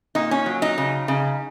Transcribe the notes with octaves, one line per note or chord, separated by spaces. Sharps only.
A#2 D#4
C#4
F#3
D#4
C#3
C#3